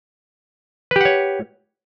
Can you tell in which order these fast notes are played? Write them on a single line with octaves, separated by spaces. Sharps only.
B4 G4 F#5 C#5